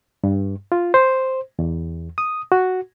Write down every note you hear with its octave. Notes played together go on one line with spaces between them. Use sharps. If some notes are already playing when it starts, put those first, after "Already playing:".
G2
F4
C5
E2
D#6
F#4